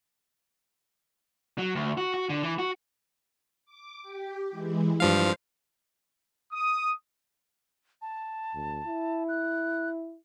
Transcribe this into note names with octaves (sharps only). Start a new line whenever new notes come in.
F#3
D2
F#4
F#4
D3
E3
F#4
D6
G4
E3 G#3 E4
G2 F3 C5 F5
D#6
A5
D2
E4
F#6